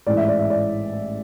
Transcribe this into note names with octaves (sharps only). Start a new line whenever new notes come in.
A1 G#2 E3 D5
E5
D5
E5
D5